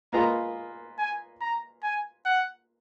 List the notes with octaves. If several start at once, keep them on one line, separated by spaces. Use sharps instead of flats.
A#3 F4 G#4 B4 D#5 A#5
G#5
A#5
G#5
F#5